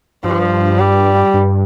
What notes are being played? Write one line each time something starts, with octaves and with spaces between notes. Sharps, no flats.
G2 F3
G3
G2